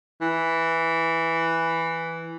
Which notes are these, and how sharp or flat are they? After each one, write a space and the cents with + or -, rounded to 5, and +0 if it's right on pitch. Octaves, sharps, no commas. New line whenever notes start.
E3 +0